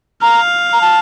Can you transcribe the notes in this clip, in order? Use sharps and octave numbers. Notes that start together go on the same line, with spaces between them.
F5 A#5
A#5
A5